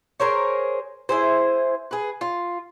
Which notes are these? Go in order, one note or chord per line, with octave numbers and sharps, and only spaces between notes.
G#4 A#4 C5 C#5
E4 G#4 C5
G#4 B4
F4